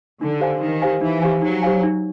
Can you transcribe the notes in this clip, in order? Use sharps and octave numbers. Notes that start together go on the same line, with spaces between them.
D3 D#4
G4 C5 F5 G#5
D#3 D#4
G4 C5 F5 G#5
E3 D#4
G4 C5 F5 G#5
F#3 D#4
G4 C5 F5 G#5
D#4